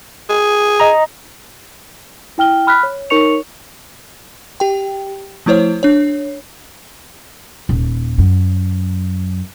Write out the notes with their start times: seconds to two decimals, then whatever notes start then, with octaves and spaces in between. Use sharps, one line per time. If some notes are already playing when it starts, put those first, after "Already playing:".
0.29 G#4
0.80 D#5 A#5
2.38 E4 G5 F6 G7
2.67 B5 F6 F#6 B6
2.83 C#5
3.10 D#4 A#4 C#5 C#6 C#7 F7
4.60 G4 G5
5.46 F3 A3 E4 C5 C#5
5.83 D4 C#5
7.69 D#1
8.18 F#2